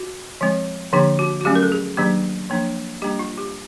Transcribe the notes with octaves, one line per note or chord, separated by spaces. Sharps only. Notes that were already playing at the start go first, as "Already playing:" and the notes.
Already playing: F#4
F3 G#3 C4
D3 F3 A#3 D4 G4
F#4
F#4
F#3 A3 C#4 G4
A#4
A4
G#4
D#3 F#3 A#3 D4 G4
F3 A#3 D4
G3 A#3 D4 G4
F4
G4